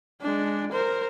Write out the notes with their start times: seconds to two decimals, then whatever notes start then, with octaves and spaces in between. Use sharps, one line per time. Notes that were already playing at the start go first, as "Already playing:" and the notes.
0.22 G#3 D4
0.72 A#4 C5